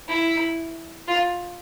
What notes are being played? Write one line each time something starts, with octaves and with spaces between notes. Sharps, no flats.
E4
F4